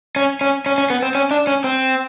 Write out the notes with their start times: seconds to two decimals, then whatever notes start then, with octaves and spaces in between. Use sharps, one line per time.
0.16 C#4
0.41 C#4
0.66 C#4
0.78 C#4
0.90 B3
1.02 C4
1.15 C#4
1.31 D4
1.47 C#4
1.64 C4